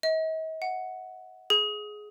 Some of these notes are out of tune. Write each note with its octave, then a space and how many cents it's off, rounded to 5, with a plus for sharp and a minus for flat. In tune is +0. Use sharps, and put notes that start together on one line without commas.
D#5 +45
F#5 +0
G#4 +15